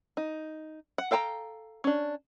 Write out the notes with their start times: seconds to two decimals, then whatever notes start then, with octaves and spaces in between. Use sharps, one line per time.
0.17 D#4
0.98 F#5
1.11 A4 F5 G5 A5 A#5
1.84 C#4 D4